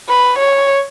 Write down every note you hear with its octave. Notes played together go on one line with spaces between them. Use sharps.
B4
C#5